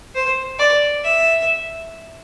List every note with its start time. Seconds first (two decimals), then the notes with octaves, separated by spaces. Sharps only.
0.15 C5
0.59 D5
1.04 E5